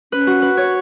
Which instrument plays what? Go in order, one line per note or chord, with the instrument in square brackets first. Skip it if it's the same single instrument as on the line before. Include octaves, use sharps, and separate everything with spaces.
[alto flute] C#4 [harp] B4
[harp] F#4
B4
C#5